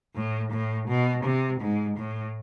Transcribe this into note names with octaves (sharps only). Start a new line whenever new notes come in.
A2
A2
B2
C3
G#2
A2